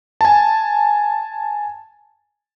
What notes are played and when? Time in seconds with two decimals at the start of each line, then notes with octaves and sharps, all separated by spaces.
0.21 G#5 A5